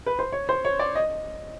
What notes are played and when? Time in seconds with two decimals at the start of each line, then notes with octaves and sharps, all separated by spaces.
0.06 B4
0.19 C5
0.32 C#5
0.49 C5
0.65 C#5
0.79 D5
0.95 D#5